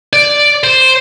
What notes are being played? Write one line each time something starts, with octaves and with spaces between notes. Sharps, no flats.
D5
C5